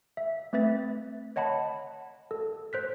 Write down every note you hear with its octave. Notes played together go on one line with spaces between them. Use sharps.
E5
A3 C4 B4 E5 A6
C#5 D#5 F#5 A5 B5
A4
C5 F#6 B6